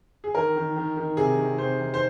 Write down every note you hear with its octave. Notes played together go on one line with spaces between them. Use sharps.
G#4
D#3 A#4
D#3
D#3
D#3
C3 G#4
D#3
C3 C5
D#3
C5